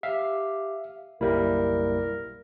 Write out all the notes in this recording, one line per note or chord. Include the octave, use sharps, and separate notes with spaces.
G4 E5 F5
F#1 B1 G3 A#3 E4 A#4